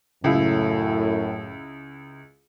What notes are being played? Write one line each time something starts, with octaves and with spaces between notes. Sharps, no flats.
C#2 F#2 A2 E4